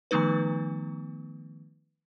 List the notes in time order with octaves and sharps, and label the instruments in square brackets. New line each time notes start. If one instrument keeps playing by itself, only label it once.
[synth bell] D#3 F3 A3 B3 D#4 B4